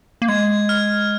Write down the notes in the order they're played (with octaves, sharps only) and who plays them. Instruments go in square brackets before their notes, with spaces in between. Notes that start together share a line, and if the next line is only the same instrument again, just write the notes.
[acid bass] A#3
[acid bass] G#3 [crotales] G#6
[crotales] F6